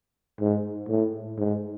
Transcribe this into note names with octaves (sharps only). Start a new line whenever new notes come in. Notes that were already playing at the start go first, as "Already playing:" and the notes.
G#2
A2
G#2